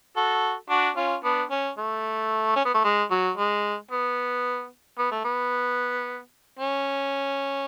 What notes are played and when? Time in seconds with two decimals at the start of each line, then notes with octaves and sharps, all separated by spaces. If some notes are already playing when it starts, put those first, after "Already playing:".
0.16 F#4 A4
0.70 D4 F#4
0.96 C#4 F4
1.24 B3 D4
1.51 C#4
1.78 A3
2.56 C#4
2.65 B3
2.74 A3
2.84 G#3
3.11 F#3
3.37 G#3
3.91 B3
4.98 B3
5.11 A3
5.25 B3
6.59 C#4